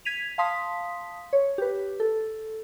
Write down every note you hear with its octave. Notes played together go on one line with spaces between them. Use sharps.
G#6 B6 D#7 F7
F5 A5 C6 D#6 B6
C#5
G4 B4
A4